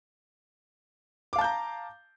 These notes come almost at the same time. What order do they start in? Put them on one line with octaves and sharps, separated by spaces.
D6 F5 A5 G6 A#5